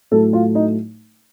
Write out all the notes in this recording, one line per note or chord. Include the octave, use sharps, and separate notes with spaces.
A2 F#3 A3 A4
F4
D#4